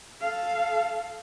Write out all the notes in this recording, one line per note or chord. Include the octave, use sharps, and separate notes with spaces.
A4 F5